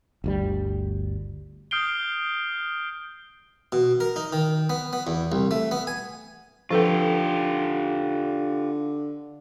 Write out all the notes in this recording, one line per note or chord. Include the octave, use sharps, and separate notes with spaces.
G1 D2 G3
D#6 F6 G6 C7 D7 G7
B2
A#4
D#4
D#3
B3
B3
E2
C2
A3
B3
G#5
D3 F3 F4 G4 A4 B4